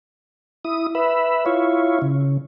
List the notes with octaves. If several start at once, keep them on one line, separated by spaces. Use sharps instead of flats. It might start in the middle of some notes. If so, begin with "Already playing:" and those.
E4 D#6
B4 E5
E4 F4 C#5
C#3